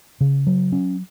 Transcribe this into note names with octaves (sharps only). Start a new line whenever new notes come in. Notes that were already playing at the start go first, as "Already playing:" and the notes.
C#3
F#3
C#4